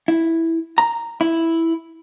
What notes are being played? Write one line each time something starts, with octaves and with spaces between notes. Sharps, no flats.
E4
A#5
E4